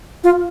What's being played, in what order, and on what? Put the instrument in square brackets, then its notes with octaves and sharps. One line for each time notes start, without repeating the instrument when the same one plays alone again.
[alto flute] F4